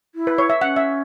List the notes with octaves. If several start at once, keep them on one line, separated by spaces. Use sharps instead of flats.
E4
B4
C#5
E5
C#4 F#5
E5